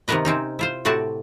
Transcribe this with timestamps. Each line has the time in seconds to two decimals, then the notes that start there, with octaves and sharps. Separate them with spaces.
0.08 C3 D#3 B3 A#4 B4 D#5
0.25 C3 C4 C#4 D#4
0.59 E4 F4 C5
0.85 A2 C3 C4 F#4 D5 A5